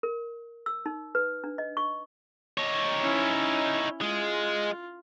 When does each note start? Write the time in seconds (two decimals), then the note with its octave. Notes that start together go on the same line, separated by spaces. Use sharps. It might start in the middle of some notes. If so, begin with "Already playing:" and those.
0.03 A#4
0.66 E6
0.86 D#4
1.15 B4
1.44 D4
1.58 D#5
1.77 C#6
2.58 D#4 C#5
3.02 C#4 E4
4.01 G#3 F4